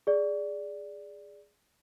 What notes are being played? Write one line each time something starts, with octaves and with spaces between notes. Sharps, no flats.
G#4 D5